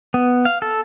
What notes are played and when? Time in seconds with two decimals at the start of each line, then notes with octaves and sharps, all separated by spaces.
0.14 B3
0.45 F5
0.62 A4